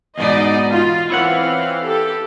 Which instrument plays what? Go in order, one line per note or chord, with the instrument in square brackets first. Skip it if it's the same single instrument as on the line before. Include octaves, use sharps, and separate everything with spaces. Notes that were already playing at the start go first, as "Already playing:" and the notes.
[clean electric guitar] E2 G#2 B2 [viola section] D#4 D5 D#5
[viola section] F4
[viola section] E3 C4 F5 [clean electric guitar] E4 C#5 F#5
[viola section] G4 A4